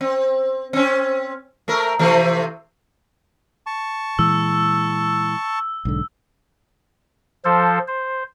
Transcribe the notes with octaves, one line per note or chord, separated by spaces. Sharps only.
C4
C4 C#4
A3 A#4
C3 E3 A3
A5 C#6
A#2 E3 G#3 E6
B1 G#2 D3
F3 A4 C5
C5